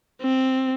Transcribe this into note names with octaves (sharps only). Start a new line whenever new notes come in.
C4